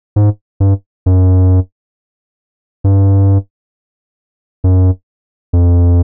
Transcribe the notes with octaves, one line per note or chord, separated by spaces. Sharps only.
G#2
G2
F#2
G2
F#2
F2